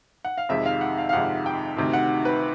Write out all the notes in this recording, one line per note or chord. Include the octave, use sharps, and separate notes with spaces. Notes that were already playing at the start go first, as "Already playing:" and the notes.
F#5
F5
F2 C3 D#3 G#3 E5
F5
F#5
F5
F5
F2 C3 D#3 G#3 F#5
G5
D2 C3 D#3
F#5
B4